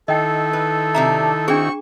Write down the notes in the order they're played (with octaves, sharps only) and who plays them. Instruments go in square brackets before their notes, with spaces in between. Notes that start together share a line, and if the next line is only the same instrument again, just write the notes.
[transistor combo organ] D#3 E4 [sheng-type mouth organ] A4 [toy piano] D#5 G5
[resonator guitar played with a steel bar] B4
[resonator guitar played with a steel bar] C3 D4 E5 [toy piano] A#5
[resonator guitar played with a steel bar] C4 F#4 [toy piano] D4 G#4 [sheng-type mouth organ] C#6